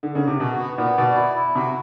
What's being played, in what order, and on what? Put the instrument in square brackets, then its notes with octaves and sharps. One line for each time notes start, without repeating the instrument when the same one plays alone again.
[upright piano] D3
C#3
C3
[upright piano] B2 [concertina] F#4
[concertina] B3
[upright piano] A#2 [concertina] B3
[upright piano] B2 [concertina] D5
[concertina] E4
E4
[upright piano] C3 [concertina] F#4